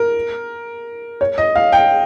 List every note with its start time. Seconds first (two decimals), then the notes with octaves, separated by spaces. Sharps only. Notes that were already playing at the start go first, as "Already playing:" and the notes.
Already playing: A#4
1.21 C#5
1.38 D#5
1.56 F5
1.72 G5